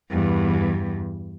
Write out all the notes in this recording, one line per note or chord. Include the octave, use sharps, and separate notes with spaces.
E2 G2